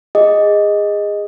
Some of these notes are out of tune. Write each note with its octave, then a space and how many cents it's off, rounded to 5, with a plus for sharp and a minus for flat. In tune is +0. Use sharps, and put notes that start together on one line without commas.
G#4 -25 D#5 +0